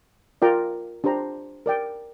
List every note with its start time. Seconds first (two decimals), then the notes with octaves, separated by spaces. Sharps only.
0.42 F4 A#4 D5 G5 A#5
1.04 D4 G4 C5 A#5
1.66 A#4 D5 G5